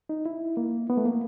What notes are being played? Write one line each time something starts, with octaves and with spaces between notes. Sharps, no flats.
D#4
E4
A#3
B3
A3
A#3